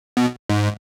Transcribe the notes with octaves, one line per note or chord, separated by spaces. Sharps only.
B2
G#2